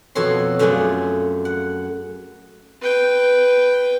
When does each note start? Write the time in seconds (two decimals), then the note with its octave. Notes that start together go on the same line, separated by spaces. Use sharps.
0.15 F2 B2 F#4 A4 C#5 C6
0.59 F#2 A3 F4 G#4 D5 F#5
1.45 F#5
2.82 B4 G5